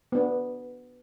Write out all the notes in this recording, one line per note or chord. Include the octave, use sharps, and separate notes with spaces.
B3 D4